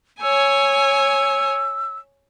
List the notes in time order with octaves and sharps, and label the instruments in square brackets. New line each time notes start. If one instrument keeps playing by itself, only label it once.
[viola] C#5 G#5 [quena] E6